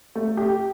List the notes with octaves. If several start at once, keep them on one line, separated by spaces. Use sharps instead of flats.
A3
G4